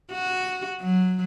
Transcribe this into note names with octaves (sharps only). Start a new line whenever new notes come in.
F#4
F#3